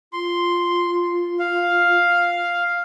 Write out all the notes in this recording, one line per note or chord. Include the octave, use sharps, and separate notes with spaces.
F4 C6
F5